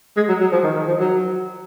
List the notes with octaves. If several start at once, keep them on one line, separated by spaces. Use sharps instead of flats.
G#3
F#3
F#3
F3
D#3
D#3
F3
F#3